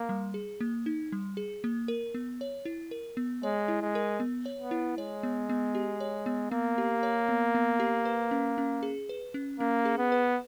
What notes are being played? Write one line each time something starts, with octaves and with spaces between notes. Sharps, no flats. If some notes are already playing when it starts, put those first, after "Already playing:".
Already playing: A#3
G3
G#4
A#3
D#4
G3
G#4
A#3
A#4
B3
C#5
E4
A#4
B3
G#3 C#5
E4
G#3
A#4
B3
C#5
B3
E4
G#3 C#5
B3
B3
G4
C#5
B3
A#3 B3
G4
C#5
B3
B3
G4
B4
C#4
C#4
G#4
B4
C#4
A#3 C#4
G#4
B3
B4